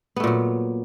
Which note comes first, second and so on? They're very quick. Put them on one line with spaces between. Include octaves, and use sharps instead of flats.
B3 A3 A#2 F#3